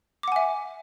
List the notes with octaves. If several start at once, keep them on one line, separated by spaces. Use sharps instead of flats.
E5 F#5 G#5 D6